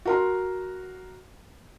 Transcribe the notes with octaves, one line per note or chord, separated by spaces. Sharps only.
F#4 A#4 C6